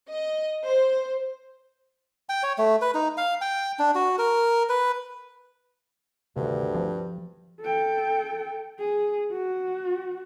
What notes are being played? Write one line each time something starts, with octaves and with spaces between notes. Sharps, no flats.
D#5
C5
G5
C#5
A3
B4
D#4
F5
G5
D4
F#4
A#4
B4
D2 G2 C3 D#3
F3 C4
A4 G5
G#4
F#4